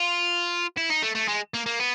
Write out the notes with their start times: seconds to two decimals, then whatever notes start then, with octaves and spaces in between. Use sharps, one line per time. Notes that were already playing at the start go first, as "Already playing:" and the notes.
Already playing: F4
0.77 E4
0.90 D#4
1.03 A3
1.15 A3
1.28 G#3
1.54 A#3
1.66 A#3
1.80 B3